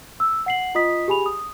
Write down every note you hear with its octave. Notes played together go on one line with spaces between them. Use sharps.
E6
F#5 C7 F#7
F4 D#5 D#6 B6
G4 G#4 G#5 B5 F7
D#6